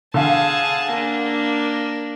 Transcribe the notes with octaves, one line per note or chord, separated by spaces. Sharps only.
D3 G#4 F5 A5
A#3 D4